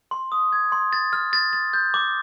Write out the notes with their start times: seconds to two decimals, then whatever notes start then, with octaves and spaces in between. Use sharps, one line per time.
0.11 C6
0.32 D#6
0.53 G#6
0.72 C6
0.93 A6
1.13 F6
1.33 A6
1.53 A6
1.73 G6
1.94 D6